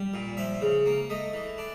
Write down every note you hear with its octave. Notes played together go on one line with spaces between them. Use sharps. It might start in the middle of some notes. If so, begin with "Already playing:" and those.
Already playing: G3
A#2
F3 E5
C#3
A#3
A3 D#5
E3
D4